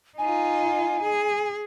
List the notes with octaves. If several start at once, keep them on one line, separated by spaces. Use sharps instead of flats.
D#4 F4 G#5
G#4